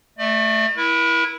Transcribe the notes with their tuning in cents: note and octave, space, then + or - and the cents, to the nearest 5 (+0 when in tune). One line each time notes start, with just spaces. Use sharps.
A3 +0 D5 +35
E4 +0 A#4 +45